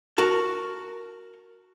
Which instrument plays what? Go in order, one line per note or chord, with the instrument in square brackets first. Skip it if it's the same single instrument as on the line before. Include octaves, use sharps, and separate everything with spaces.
[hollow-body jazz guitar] F#4 A#4 A5